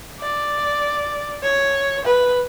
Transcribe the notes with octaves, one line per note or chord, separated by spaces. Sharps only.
D5
C#5
B4